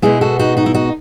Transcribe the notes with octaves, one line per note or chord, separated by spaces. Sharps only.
B2 G#3 B3 E4 G#4
F#4 A4
D#4 F#4
D#4 F#4
E4
D#4 F#4